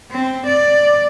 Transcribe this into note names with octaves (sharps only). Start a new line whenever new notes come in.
C4
D5